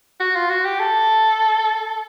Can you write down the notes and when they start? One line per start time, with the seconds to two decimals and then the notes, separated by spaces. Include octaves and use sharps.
0.20 F#4
0.35 F4
0.50 F#4
0.65 G4
0.80 A4